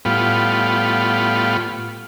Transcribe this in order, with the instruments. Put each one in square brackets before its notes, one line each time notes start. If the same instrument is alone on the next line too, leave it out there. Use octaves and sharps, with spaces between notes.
[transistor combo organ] A2 G3 B3 F4